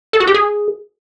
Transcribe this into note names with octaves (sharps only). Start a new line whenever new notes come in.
A4
F#4
G4
G#4